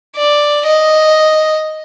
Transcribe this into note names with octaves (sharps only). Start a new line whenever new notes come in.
D5
D#5